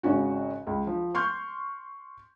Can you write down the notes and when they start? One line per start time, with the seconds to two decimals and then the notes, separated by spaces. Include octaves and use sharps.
0.03 G#1 C#3 C#4 F#4
0.67 C#2
0.87 F3
1.15 C6 C#6 F6 G6